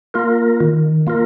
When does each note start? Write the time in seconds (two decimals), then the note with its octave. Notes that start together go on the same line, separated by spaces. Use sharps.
0.14 A#3 F4 A#4
0.60 D#3
1.07 A#3 F4 A#4